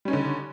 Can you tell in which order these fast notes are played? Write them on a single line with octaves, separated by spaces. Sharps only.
G3 C#4 D#4 D3